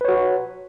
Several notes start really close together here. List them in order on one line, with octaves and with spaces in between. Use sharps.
B4 C#5 F#4